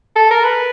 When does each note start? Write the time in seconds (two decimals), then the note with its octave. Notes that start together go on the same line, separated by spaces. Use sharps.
0.16 A4
0.31 A#4
0.44 B4